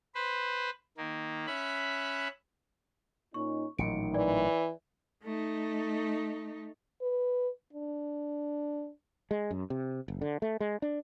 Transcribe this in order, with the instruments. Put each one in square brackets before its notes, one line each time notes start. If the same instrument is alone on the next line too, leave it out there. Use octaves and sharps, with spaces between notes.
[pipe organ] B4 C5 B5
D#3 A#3
C#4 E5 B5 F#6
[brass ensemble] A#2 C#4 D#4 [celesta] C#6
[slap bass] A1 A#2 F#3 [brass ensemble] D#3 [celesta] C#7 D7
[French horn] E3 [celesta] D5
[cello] A3 D#4
[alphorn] B4
D4
[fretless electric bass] G#3
F#2
C3
F#1
D3
A3
G#3
D4